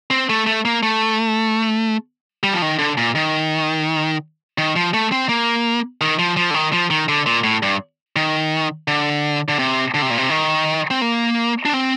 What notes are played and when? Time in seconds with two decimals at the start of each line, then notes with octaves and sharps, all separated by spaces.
0.11 C4
0.30 A3
0.46 A3
0.65 A#3
0.83 A3
2.43 G3
2.53 F3
2.62 D#3
2.79 D3
2.98 A#2
3.15 D#3
4.58 D#3
4.76 F3
4.94 A3
5.12 C4
5.29 A#3
6.01 D#3
6.19 F3
6.37 F3
6.50 D3
6.54 D#3
6.73 F3
6.90 D#3
7.09 D3
7.26 A#2
7.43 A2
7.63 G2
8.16 D#3
8.88 D3
9.49 D3
9.59 C3
9.94 D3
10.02 C3
10.10 A#2
10.18 C3
10.30 D#3
10.91 C4
11.02 A#3
11.65 D4
11.74 C4